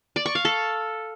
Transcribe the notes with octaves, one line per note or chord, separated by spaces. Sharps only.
D5
C#6
F5
A4